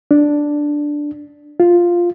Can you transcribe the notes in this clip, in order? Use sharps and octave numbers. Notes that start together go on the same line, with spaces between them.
D4
F4